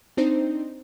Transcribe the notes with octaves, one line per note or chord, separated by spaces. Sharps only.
C4 D4 D#4 C5